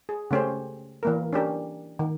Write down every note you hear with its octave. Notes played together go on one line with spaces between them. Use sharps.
G#4
C#3 A3 C#4 G4 C5
E3 A#3 A#4
C#4 D4 G4 A#4
D#3